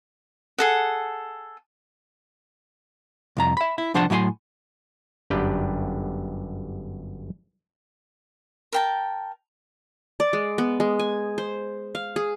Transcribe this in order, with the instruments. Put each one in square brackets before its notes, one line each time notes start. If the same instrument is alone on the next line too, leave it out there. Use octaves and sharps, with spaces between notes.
[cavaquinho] G#4 A4 F#5
[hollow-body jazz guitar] C2 F2 A#5
E5 B5
E4
C2 F3 D4 C5 F#5 A5
A2 F#3 E4 G#5 C6
[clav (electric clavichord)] G1 F#2 D4 G4 B4 G5
[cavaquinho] A#4 G5 A5
[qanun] D5
G#3
B3
G#3
G#5
C5
F5
G#4